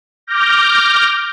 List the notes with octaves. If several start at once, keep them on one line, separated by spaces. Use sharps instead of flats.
D6 F6 G6 A#6